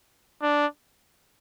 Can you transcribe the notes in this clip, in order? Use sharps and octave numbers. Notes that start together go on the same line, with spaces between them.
D4